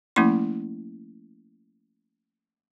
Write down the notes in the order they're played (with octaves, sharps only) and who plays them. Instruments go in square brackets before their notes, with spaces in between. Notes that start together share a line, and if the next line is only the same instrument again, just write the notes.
[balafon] F3 A3 A#3 C#4 E4 C6